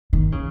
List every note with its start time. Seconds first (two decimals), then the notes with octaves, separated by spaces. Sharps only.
0.13 D#3
0.32 C#3